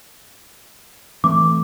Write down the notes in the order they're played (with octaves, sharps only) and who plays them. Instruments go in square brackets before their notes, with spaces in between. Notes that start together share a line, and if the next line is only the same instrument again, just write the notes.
[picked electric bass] E3 A3 C4 [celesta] D6